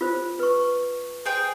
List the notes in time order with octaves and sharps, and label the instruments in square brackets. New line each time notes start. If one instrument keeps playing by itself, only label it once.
[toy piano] F4 C5
B4 C#6
[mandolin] G#4 G5